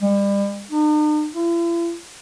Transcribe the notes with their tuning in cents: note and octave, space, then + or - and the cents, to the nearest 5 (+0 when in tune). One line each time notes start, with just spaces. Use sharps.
G3 +35
D#4 -45
E4 +45